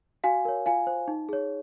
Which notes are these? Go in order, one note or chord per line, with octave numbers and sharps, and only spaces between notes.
F#4 F5 G#5
A#4 C#5
F4 F5 G#5
C5
D#4
G#4 C#5